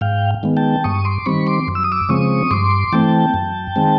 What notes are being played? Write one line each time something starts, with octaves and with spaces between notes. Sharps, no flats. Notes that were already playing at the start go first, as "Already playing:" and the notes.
G#2 F5 G5
D#3 G#3 B3
G5 A5
G2 C#6 D#6
C6 D6
D#3 G3 C4 B5 C#6
C6 D6
F#2
E6
D#6
D6 E6
C#3 F3 G#3 C4 C#6 D#6
G2 C6 D6
E3 A3 C4 G5 A5
F#2
D#3 G#3 C4